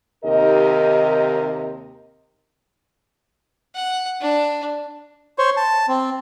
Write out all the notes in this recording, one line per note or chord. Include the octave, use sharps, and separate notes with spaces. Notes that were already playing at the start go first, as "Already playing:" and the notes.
D#2 C3 D#4 G4 A#4 D#5
F#5
D4
C5 C#5
A5
C4